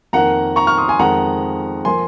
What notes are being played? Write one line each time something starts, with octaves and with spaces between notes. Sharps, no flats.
F2 D#3 A#3 F#5 A#5
A#5 C#6
C#6 F6
C6 D#6
G#5 C6
F2 D#3 G#3 F#5 A#5
F3 A#3 G#5 C6